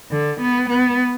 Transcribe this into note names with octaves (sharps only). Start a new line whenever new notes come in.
D3
B3
B3